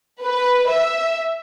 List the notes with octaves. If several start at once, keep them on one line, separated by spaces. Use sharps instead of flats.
B4
E5